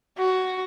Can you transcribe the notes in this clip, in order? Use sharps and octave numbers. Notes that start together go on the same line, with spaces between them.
F#4